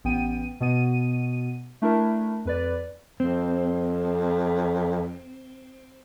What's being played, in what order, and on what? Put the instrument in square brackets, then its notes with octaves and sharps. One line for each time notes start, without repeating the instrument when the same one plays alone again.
[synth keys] A1 B3 G5 D#7
B2 B3 D#7
A3 D4 E4 A#4
F2 B4 D5
[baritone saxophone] F2 [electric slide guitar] C4